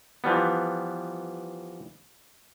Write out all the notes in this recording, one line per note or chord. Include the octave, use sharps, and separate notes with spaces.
E3 F3 G3 B3